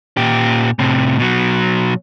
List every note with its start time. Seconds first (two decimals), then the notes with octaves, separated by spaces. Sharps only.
0.17 A#2 G4
0.79 A2 C3
1.19 B2 F#3